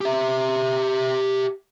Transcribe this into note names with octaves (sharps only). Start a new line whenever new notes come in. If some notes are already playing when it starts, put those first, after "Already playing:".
G4 E5